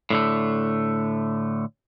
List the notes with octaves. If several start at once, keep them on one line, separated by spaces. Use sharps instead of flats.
A2 D3 A3